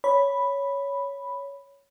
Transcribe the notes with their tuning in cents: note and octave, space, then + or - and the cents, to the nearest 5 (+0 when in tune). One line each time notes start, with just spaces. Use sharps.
C#5 +10 B5 +0